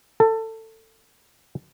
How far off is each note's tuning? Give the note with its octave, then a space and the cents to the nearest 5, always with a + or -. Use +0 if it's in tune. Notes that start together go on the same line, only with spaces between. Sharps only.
A4 +20